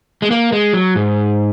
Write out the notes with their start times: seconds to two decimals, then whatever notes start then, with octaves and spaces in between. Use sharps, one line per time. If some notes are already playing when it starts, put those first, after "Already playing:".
0.22 G#3
0.31 A#3
0.52 G#3
0.73 F#3
0.95 G#2